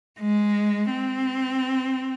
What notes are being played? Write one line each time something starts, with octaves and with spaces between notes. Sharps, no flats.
G#3
C4